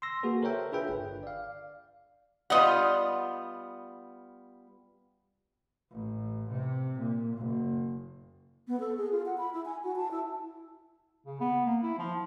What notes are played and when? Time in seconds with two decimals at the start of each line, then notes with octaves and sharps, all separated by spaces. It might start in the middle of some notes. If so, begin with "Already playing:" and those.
0.02 C6 E6 A#6
0.23 A#3 F#4 G#4 B4
0.42 A4 A#4 C5 C#5 E5 G5
0.72 D4 F4 G#4 B4 E5 G5
0.89 G1
1.23 D5 F5
2.50 G3 B3 F4 D#5 F#5
5.91 A1
6.50 C3
6.99 A#2
7.37 F#1
8.68 B3
8.80 A4
8.97 G#4
9.11 F4
9.26 F#5
9.38 B5
9.53 E4
9.65 G#5
9.84 F#4
9.96 A5
10.11 E4
11.25 C#3
11.41 B3
11.66 A#3
11.83 E4
11.98 F3